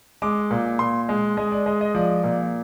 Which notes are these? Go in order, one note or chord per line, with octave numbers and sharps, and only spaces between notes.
G#3 D6
A#2
A#2 C6
G#3
G#3 D#5
D5
G#3 D#5
D#5
F3 D5
A#2